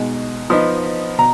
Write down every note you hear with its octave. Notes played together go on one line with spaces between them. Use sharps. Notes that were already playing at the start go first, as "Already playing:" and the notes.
Already playing: B2 G#3 D#4
F3 B3 D#4
B2 A#5